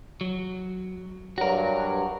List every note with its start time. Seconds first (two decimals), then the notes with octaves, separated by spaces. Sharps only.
0.21 F#3
1.38 G2 F#3 F#4 A#4